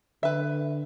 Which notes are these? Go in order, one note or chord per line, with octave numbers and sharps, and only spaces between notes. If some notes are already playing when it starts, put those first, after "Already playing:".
D3 B4 E5